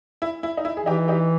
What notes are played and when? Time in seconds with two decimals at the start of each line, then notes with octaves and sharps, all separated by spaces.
0.22 E4
0.43 E4
0.57 D#4
0.65 E4
0.77 G#4
0.86 E3 D#4 G4
1.08 D#4 G4